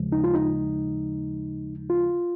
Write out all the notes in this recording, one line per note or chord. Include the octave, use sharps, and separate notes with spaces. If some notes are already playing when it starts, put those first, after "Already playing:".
Already playing: D#2 C#3 F3 G#3
D#4
F4
D#4
F4